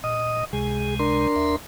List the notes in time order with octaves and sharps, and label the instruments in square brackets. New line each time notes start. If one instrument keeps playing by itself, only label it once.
[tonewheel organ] A#2 [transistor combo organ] D#5 D#6
[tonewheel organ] C#2 C3 G#3 [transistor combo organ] G#4
[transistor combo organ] D4 A#4 C6
[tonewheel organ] D#2 E5